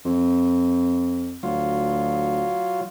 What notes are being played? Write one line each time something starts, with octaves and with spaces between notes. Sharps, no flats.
F2
D2 F#3 F4